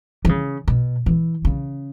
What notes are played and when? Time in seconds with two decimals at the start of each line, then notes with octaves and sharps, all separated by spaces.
0.25 E3
0.29 C#3
0.68 B2
1.06 E3
1.45 C#3